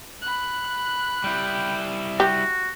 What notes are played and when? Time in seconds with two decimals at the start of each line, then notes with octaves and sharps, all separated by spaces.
0.22 B5 F#6
1.24 G3 E4 G5
2.20 F#4 G4